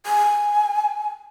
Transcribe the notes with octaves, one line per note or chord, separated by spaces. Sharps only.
G#5